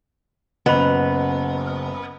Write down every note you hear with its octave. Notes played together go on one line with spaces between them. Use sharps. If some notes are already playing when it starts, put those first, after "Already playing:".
F#1 B3 D#5 B5 F7